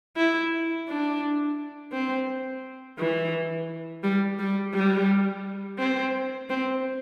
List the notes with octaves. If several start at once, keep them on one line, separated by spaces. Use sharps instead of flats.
E4
D4
C4
E3
G3
G3
G3
C4
C4